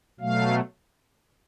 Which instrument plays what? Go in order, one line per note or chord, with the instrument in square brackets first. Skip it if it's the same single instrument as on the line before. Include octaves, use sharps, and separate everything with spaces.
[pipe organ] B2 F#3 A3 F5